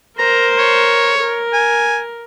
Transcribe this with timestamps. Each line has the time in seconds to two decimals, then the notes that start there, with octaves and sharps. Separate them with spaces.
0.18 A#4 C5 A#5
0.58 C#5
1.19 A#4
1.53 G#5